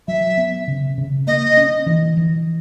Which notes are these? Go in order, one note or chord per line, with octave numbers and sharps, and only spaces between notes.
F#3 E5
B3
C#3
C#3
A#3 D#5
C#4
E3
E3